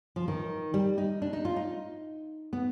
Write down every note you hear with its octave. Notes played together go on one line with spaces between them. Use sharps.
F3
D#3
G3
D#4
D4
D#4
F4
D#4
B3